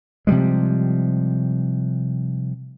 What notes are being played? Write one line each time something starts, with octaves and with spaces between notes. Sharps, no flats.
C3 F3 G3 G#3